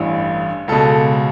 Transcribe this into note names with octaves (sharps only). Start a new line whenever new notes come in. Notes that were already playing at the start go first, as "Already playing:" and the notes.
Already playing: A1 G2 E3
C#2 B2 A4